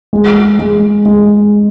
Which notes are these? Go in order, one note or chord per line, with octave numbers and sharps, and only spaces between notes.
G#3
G#3
G#3